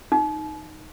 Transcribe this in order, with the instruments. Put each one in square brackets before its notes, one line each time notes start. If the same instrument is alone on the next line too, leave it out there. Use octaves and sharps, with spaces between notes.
[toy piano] D#4